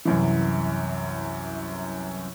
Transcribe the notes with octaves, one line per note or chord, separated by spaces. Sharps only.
C2 F#2 E3